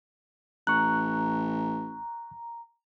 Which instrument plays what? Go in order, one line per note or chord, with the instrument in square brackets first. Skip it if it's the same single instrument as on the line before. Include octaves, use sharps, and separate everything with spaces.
[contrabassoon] A1 [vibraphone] A#5 [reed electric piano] C#6 F#6